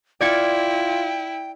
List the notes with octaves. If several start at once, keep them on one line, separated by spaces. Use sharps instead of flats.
E4 F4 D5 G5 G#6 C#7